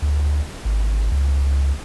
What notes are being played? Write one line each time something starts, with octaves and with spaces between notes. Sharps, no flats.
D2
G#1
C#2